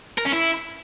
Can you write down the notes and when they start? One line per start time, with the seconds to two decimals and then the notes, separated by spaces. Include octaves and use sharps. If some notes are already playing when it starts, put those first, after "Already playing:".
0.18 A#4
0.25 C#4
0.32 E4